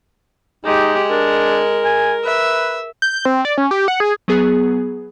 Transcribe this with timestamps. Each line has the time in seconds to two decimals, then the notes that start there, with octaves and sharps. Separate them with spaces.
0.65 G#3 D#4 G4
1.10 D4 A#4
1.85 G#5
2.25 B4 E5
3.02 G6
3.25 C4
3.45 D5
3.58 C#4
3.71 G4
3.88 F#5
4.00 G#4
4.28 F#3 B3 G#4